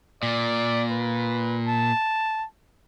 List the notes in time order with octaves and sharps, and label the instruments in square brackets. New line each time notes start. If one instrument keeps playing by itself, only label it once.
[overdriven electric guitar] A#2 [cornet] D5
[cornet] B4
A5